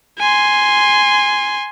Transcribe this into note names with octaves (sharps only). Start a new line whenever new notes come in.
G#5 C6